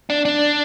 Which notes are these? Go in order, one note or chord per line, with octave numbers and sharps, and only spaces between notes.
D4
D4